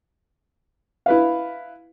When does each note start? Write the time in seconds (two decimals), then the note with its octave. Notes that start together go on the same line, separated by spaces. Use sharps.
1.06 E4 B4 F5